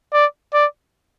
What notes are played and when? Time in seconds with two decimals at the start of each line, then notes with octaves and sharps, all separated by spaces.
0.13 D5
0.53 D5